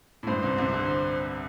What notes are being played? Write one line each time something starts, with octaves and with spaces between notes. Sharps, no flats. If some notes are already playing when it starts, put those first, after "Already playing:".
A2
G2 C5
C2 C3
C2 C3
D3